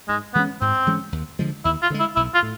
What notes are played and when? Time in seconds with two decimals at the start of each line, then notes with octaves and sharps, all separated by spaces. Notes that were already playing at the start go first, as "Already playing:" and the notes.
0.08 G#2 G#3
0.34 E3 G#3 B3 C#4
0.61 G#2 C4
0.87 E3 G#3 C#4
1.12 D#2
1.39 D3 F3 G#3
1.65 D#2 E4
1.82 F4
1.90 D3 F3
1.94 G#3
1.99 E4
2.16 B1 E4
2.34 F4
2.43 A2